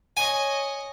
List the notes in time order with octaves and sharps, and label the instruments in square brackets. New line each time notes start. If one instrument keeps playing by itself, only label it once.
[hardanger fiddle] C#5 D#5 [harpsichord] G#5